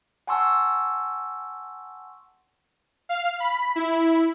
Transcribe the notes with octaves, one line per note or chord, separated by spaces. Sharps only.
F#5 G#5 A5 C6 C#6 E6
F5
B5
E4